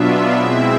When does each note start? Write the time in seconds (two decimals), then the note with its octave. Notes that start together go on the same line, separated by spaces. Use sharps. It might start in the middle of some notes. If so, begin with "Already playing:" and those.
Already playing: B2 F#3 B3 D4 F4 E5
0.34 B2 G#3 C4 E4